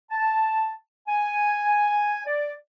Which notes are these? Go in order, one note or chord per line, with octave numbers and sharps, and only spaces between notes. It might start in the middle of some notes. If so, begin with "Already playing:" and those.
A5
G#5
D5